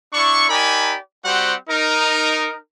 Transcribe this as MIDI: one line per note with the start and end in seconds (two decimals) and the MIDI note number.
0.13 0.48 62
0.13 0.48 64
0.13 0.48 74
0.13 0.48 85
0.49 0.97 63
0.49 0.97 67
0.49 0.97 70
0.49 0.97 74
0.49 0.97 80
0.49 0.97 83
1.25 1.55 55
1.25 1.55 60
1.25 1.55 66
1.25 1.55 67
1.25 1.55 72
1.25 1.55 78
1.70 2.56 63
1.70 2.56 70